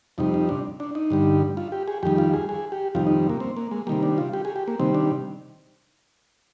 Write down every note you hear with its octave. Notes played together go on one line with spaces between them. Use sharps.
F2 C3 G3 D#4
D#4
D4
D4
D#4
G2 D3 G3
F4
G4
G#4
F2 D#3 G3 G4
F4
G#4
G#4
G4
F2 C3 D#3 G3 F4
D#4
A#3
C4
A#3
G#3
C3 D#3 G3 A#3
D4
F4
G4
G#4
G4
A#3
C3 D#3 G3 C4
D4